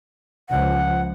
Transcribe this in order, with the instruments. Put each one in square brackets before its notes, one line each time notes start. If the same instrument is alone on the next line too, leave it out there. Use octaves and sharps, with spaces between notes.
[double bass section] C#2 F3 [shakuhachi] F#5